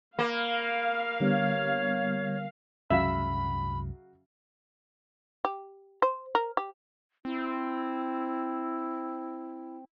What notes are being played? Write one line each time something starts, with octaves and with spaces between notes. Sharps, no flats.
A#3 F5 B5
D3 G3 B3 C#5
C2 F#2 C#3 F#3 G#3 E5 F5 B5
G4
C5
A#4
G4
C4 E4